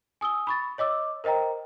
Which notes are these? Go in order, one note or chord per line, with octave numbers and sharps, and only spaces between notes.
G#5 D#6 E6 G7
B5 C#6 A6
C#5 D#5 D6 E6
A#4 C5 D#5 G5 A#5